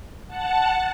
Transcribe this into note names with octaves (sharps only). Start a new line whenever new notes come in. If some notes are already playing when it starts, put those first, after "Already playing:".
F#5 A5